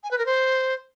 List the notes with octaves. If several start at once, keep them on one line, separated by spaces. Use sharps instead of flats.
G#5
B4
A#4
C5